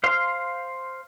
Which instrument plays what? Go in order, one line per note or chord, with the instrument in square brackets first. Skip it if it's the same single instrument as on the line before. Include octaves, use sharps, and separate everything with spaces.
[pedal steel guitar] C5 F5 C6